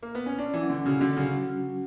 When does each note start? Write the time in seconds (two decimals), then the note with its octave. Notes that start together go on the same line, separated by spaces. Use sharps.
0.03 A#3
0.15 B3
0.26 C#4
0.38 C#4 D4
0.54 E3
0.62 F#3
0.70 D3
0.86 C#3 F#4
1.01 D3
1.09 F#3
1.17 C#3